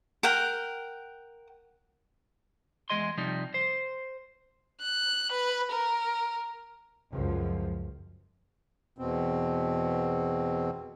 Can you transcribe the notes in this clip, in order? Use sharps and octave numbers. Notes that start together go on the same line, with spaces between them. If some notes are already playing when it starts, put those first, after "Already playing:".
A#4 F#5 G5
E2 G#3 G#4 D#5 C6
C3 F3 G3 D#4
C5
F#6
B4
A#4
C#2 F#2 F3
E2 B2 C4